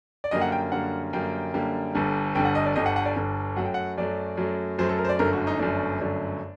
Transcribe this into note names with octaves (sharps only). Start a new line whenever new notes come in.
D5
F#2 D3 G3 A#3 D#5
F#5
G5
F#2 D3 G3 A#3 F#5
F#2 D3 G3 A#3 G5
F#2 D3 G3 A#3
G1 G2 D3
G1 G2 D3 G5
F#5
D#5
D5
G1 G2 D3 D#5
F#5
F#5
D5
G1 G2 D3
F#2 F#3 A3 F#5
G5
F#5
F#2 F#3 A3 D5
F#2 F#3 A3
F#2 F#3 A3 C5
A4
A#4
C5
D5
G1 F#2 D3 A3 A#4
F#4
D#4
G1 F#2 D3 A3 D4
G1 F#2 D3 A3 D4